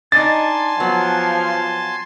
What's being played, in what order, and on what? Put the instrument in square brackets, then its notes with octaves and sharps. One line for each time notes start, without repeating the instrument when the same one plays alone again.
[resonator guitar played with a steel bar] D4 D#4 [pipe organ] G#5 A5 C6 [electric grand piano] A6
[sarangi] F3 [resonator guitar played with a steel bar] F#3 B3